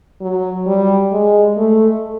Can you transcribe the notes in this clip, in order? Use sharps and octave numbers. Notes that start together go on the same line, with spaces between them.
F#3
G3
G#3
A3